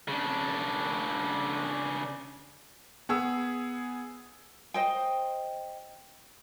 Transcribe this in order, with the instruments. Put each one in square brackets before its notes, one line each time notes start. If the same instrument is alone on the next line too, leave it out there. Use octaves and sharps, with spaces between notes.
[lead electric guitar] C#3 D4
[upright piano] B3 G#4 E6
[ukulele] C5 D#5 G5